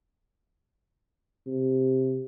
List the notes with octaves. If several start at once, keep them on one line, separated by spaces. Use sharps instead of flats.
C3